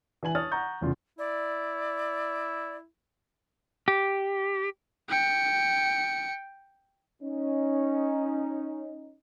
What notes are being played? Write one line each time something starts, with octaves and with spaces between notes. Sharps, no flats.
E3 B4 G#5 F#7
C#5 A5 D#6 F6 A6
F#5 A#5 C#6 G6
F1 E2 C#3 F4
E4 D5
G4
G5 C#7
C#4 D#4